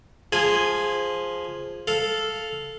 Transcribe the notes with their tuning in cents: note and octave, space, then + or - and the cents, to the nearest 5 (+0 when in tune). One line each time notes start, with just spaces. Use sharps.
F3 +0 G#4 +0 G#5 -20
A4 -5 F5 +0